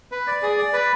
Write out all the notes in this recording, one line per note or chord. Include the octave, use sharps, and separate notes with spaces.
B4
D5
G#4
D5
B4